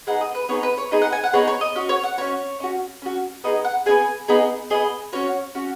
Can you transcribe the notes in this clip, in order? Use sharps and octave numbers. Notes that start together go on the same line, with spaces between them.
B3 D#4 G#4 F#5
D#5
B4
B3 D#4 G#4 C#5
B4
C#5
B3 D#4 G#4 D#5
F#5
G#5
F#5
B3 D#4 G#4 C#5
C#5
D#5
C#4 F#4 D#5
C#5
F#5
C#4 F#4 C#5
C#4 F#4
C#4 F#4
B3 D#4 G#4 D#5
F#5
B3 D#4 G#4 G#5
B3 D#4 G#4
B3 D#4 G#4 D#5
C#4 F#4 C#5
C#4 F#4